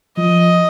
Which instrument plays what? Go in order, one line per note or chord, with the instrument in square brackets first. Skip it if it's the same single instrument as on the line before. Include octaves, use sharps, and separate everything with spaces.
[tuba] F3 [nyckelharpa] D#5